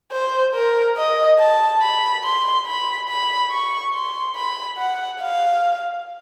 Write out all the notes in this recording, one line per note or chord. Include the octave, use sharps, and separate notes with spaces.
C5
A#4
D#5
A5
B5
C6
B5
B5
C#6
C6
B5
F#5
F5